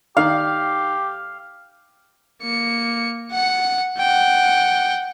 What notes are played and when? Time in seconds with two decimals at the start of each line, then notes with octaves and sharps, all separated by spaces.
0.17 D#3 G4 F5
2.42 A#3 C#7
3.31 F#5 C#7
3.98 F#5 G5